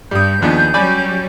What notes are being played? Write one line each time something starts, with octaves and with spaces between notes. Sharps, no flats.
G2 G3 D#6 G6
D#2 F3 B3 D4 G#4
F#3 G3 C#4 D5 G#5 B5